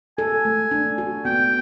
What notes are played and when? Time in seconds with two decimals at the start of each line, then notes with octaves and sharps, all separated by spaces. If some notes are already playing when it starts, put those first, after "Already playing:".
0.18 A4 G#5
0.45 A3
0.71 D4
0.98 F#4
1.25 B3 G5